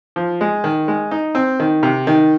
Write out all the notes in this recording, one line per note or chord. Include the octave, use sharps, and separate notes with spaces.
F3
G#3
D#3
G#3
D#4
C4
D#3
C3
D#3